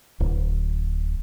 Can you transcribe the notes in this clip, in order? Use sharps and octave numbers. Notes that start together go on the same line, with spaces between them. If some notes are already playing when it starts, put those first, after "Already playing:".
D1